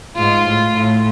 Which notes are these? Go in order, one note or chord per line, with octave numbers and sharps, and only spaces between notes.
G#2 F4
A2
A2